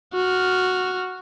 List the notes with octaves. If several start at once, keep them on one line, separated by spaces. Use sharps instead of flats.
F#4 F6